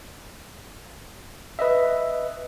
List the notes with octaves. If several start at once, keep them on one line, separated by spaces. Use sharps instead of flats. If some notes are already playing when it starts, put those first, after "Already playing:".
B4 D#5 E5